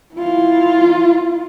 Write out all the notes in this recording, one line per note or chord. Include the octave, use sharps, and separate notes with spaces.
E4 F4